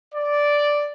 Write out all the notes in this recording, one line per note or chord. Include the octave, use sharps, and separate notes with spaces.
D5